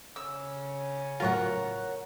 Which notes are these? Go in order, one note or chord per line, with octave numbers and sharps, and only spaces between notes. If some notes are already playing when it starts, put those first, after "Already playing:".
C#3 C#4 E6
A2 F#3 F4 A#4 C#5 F#5